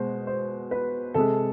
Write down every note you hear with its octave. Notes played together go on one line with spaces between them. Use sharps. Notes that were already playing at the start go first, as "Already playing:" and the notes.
Already playing: B2 G#3 C5
C5
B4
C3 G#3 A4